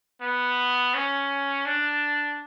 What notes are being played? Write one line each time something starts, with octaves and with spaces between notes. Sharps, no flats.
B3
C#4
D4